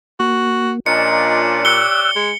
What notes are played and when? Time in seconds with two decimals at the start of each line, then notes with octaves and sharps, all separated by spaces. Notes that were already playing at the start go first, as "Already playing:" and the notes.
0.20 A#3 F#4
0.86 A#2 F3 C#4 D4 D#5 A#5 C#7
1.65 G4 C#5 D5 E6 F#6 C#7 G7
2.16 G#3